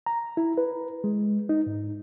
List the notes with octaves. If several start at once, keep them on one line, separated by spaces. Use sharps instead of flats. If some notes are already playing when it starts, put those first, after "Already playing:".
A#5
E4
B4
G#3
D#4
G#2